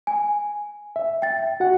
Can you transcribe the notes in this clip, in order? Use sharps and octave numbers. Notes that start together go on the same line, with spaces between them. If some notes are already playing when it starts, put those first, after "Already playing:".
G#5
E5
G5 A6
F#4 F#5